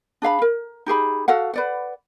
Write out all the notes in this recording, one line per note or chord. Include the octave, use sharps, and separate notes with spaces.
D4 G#4 F5 B5
A#4
D#4 G4 G#4 B5
F#4 A4 F5 F#5
B4 D5 F#5